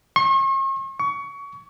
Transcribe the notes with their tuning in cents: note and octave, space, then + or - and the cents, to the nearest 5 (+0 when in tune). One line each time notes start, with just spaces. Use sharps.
C#6 -45
C#6 +25